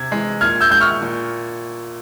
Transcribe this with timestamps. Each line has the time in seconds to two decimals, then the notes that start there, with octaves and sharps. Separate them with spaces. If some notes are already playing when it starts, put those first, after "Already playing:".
Already playing: C3 G#6
0.11 E3 G#3
0.41 A#2 F6 G#6
0.61 E6 G6
0.71 G#3 G6
0.80 C#6 F6
1.01 A#2